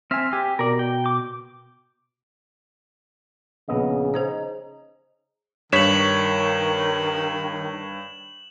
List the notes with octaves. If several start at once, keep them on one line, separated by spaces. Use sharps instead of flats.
C4 E5 G#5 F6
G4 G#5
B2 A#4 D5
G5
D6
A#1 C#3 B3 D#5
D#4 G#4 C5 D#5
G2 D#3 C#5 B6 E7 F#7